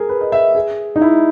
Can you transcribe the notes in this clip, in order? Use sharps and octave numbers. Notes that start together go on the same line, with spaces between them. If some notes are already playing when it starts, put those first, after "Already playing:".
Already playing: G#4 A#4
B4
D#5
E5
G#4
D#4
E4